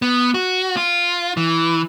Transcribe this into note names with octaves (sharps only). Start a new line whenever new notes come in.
B3
F#4
F4
E3